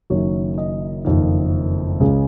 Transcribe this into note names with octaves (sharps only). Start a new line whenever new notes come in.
F#1 F#2 D#3 F#3 C#5
D#5
F#1 F2 D#3
C#2 C#3 G#3